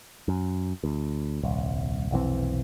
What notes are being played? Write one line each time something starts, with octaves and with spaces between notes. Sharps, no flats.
F#2
D2
D#1 C2
F1 B1 E3 C4